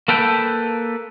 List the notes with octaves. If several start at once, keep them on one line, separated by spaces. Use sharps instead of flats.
A#3 A4 B4 G5